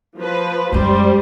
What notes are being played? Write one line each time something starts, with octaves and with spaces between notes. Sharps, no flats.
F3 B4
F#2 G3 G#3 C5